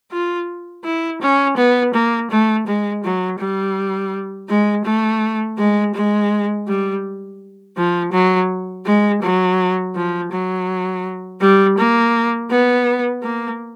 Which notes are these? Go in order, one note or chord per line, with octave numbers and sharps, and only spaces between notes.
F4
E4
C#4
B3
A#3
A3
G#3
F#3
G3
G#3
A3
G#3
G#3
G3
F3
F#3
G#3
F#3
F3
F#3
G3
A#3
B3
A#3